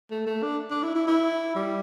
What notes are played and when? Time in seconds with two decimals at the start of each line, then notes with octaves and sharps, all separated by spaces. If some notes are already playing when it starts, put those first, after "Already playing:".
0.11 A3
0.27 A3
0.43 D4
0.71 D4
0.83 E4
0.95 E4
1.08 E4
1.55 G3